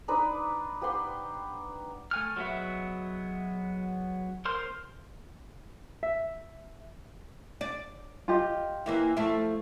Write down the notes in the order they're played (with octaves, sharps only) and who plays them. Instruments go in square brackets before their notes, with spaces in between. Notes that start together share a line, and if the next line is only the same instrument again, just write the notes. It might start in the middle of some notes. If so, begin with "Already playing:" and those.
[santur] D4 D#4 B4 D5
G4 B4 F#5 C6
[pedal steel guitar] A3 G#5 F6
F#3 G#3 B3 F#4 E5
A#4 C5 C6 F6
[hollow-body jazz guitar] E5
[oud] D5
[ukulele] F4 G4 D#5
[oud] E3 A#3 E4
F3 A3 E4